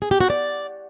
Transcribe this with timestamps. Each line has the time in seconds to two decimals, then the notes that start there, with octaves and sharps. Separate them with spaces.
0.02 G#4
0.11 G4
0.21 F#4
0.30 D5